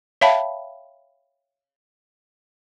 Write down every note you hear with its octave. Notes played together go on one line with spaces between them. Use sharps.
C#5 E5 F5 G5 A5 B5